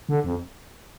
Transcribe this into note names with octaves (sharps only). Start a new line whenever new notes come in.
D3
F2